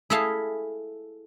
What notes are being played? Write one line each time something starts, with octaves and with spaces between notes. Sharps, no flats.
E4 G#4 A4 E5 F5 A5